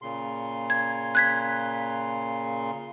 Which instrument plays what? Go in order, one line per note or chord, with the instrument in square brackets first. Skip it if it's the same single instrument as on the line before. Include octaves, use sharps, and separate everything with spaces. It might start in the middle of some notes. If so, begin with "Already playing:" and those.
[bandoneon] A#2 C#3 C6
[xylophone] G#6
F#6 G#6 B6